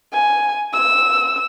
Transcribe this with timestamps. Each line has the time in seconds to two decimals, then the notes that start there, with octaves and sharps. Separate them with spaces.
0.13 G#5
0.73 E6